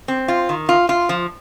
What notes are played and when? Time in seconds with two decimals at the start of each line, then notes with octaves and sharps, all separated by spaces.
0.08 C4
0.28 F4
0.49 D#3
0.69 F4
0.89 F4
1.09 F3